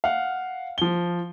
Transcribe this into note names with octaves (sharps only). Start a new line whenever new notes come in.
F5 F#5
F3 G7